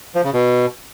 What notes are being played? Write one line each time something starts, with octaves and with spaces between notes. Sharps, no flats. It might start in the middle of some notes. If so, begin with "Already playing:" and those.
F3
C#3
B2